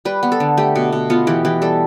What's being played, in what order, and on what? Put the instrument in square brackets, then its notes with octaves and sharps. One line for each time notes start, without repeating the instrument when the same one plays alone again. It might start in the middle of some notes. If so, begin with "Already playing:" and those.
[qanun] G3 B4
B3
A4
D3
A3 G4
B2
B2
B3 F4
E3 G4
E3 G4
G3 A4